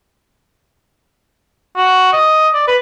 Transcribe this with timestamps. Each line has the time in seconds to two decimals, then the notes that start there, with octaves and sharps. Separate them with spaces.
1.77 F#4
2.13 D#5
2.54 D5
2.68 B4